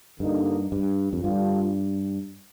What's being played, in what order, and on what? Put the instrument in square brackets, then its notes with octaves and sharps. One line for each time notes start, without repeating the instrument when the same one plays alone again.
[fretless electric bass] G2 [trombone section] D3 G3 A#3 D#4
[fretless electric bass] G2
F2
[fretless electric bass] G2 [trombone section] D3 G3 D4 F4